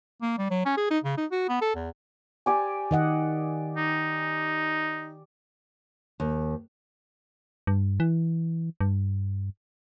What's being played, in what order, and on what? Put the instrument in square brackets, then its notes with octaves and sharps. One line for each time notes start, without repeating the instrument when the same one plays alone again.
[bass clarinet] A#3
G3
F#3
C#4
G#4
D#4
C#3
D#4
F#4
B3
A4
E2
[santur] G4 D5 G#5
[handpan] D#3 D#5 F#5
[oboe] D#4
[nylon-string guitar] D#2
[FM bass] G2
E3
G2